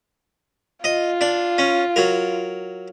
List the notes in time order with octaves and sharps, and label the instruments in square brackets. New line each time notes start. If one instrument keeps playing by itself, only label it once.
[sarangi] F4 [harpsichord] D#5
[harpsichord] D4
C#4
F#3 A#4